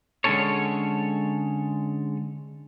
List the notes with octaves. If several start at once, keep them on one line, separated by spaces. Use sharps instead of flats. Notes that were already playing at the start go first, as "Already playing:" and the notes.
D3 G#3 A3 C#4 A4 C#5